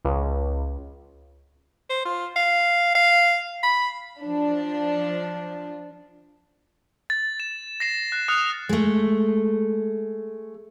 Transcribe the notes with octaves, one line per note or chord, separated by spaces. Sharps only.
C#2
C5
F4
F5
F5
B5
F3 D4
A6
A6 E7
A#6 C7 E7
F#6
D#6 F6 F#6 C#7 E7 F7
G#3 A3